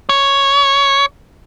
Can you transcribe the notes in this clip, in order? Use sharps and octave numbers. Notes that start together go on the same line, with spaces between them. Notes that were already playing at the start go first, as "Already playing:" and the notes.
C#5